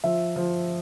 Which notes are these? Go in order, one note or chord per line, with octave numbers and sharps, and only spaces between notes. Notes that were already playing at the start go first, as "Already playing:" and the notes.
F3 E5
F3